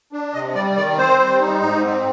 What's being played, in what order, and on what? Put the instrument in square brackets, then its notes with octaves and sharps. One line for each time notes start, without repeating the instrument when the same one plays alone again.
[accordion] D4
C3 D#5
G3 D5
D#3 D5
C4 C5
G3
D#4
G#2
C4